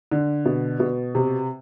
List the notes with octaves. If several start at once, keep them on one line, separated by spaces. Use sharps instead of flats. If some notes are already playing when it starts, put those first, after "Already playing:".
D3
B2
B2
C3